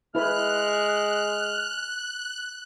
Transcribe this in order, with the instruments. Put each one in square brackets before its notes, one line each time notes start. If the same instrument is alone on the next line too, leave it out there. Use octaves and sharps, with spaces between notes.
[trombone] G#3 [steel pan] E4 B4 [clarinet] F6 [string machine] F#6